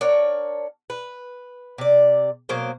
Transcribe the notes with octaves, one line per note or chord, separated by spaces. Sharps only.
D4 A#4 C#5 F#5
B4
C3 D5
B2 F#3 A#3 C5